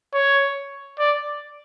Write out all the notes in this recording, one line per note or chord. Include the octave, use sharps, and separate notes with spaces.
C#5
D5